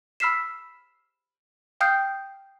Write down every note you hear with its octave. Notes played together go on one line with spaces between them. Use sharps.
B5 E6 F6 B6 C7 E7
F5 G5 D#6 F6 G6 C7